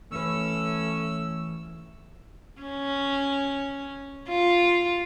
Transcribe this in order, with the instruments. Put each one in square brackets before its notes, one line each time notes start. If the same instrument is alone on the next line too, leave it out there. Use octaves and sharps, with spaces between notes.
[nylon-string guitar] E3 B4 [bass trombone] A3 [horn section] C#4 [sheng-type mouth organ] E6
[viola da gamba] C#4
F4